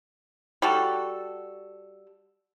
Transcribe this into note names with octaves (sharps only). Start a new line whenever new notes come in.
G3 F#4 A4